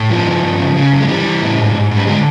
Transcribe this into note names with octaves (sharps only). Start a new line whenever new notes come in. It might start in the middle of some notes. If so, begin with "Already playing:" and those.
Already playing: A2
G2 F3
D#3
G2
C#3
C#3
F#2
G#3
E3 G3
E3
A2
G#2
G#2
G#2
G3
D3 G#3